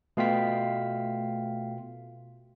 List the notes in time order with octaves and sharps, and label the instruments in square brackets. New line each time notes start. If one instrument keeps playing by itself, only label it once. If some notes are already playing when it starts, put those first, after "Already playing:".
[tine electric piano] B2 F4 B6 [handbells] A3 F5 G5